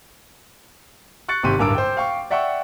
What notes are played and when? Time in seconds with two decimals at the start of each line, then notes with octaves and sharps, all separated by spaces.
1.29 C#6 F#6 A6 C#7
1.43 G#1 C3 G4 C6 C#6 D#7
1.59 D1 G2 A#4 D6 E6 D7
1.75 C5 G5
1.97 F5 G5 C#6
2.31 D5 E5 F#5 G5 C#6 E6